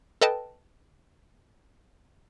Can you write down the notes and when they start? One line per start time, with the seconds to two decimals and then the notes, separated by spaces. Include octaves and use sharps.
0.21 A4 B4 D#5 G5 A5